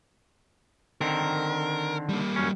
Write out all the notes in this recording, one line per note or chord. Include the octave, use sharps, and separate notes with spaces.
D3 D#3 C4 A#4
G3 A#3
F#2 C#4